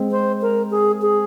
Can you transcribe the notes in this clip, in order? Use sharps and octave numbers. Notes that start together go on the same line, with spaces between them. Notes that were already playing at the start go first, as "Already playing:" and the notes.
Already playing: G#3 C4
C5
A#4
G#4
G#4